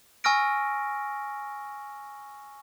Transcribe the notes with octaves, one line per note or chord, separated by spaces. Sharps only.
G#5 C#6 E6 F6 A#6 D7